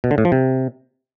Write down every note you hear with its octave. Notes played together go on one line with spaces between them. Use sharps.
B2
D3
A2
F3
C3